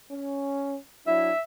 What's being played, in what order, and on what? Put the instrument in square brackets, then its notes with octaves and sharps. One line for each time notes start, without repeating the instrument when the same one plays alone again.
[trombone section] C#4
[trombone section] F#3 D4 E4 [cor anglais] E5